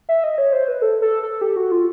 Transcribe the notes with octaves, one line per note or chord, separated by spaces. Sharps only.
E5
D#5
C#5
C5
B4
A4
A4
A4
G4
F#4
F4